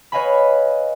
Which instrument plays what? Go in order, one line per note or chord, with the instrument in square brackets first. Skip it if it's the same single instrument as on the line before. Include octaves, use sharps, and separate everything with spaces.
[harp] B4 C#5 D#5 F5 G#5 B5